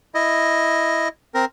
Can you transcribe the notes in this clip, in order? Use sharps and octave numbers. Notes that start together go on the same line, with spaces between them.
E4 D#5
C4 A#4